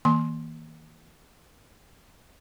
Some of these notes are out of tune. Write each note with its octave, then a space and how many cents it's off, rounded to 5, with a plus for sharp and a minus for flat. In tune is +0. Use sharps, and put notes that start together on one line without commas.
D#3 +45 A#3 +0 C6 +15